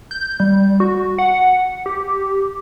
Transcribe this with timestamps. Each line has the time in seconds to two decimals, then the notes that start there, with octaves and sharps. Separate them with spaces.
0.11 G6
0.40 G3
0.80 F#4
1.18 F#5
1.86 G4